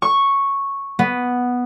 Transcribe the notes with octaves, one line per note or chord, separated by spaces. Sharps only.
C#6
B3